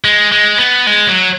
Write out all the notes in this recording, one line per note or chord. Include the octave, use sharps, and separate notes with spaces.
G#3
G#3
B3
G#3
F#3